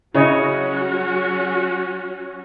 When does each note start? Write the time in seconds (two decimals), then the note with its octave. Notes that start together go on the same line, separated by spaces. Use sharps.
0.14 C#3 F#3 C#4 E4 F#4 C#5 D#5